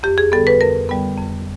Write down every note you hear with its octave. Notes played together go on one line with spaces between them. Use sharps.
F2 G4
G#4
D3 G3 B3 A4
B4
F2 A#4
D3 G3 B3
F2